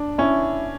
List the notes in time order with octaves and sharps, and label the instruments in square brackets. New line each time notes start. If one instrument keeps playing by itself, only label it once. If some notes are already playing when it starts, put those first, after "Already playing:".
Already playing: [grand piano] D4
[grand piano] C#4 [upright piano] E4